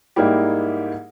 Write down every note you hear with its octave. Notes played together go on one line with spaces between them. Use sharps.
G#2 G3 A#3 D#4 E4 G4